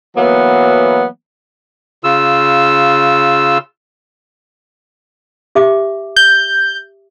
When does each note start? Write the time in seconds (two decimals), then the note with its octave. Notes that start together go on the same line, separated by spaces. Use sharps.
0.17 E3 F#3 A#3 B3
2.04 C#3 F4 E6
5.55 G4 E5 D6
6.16 G6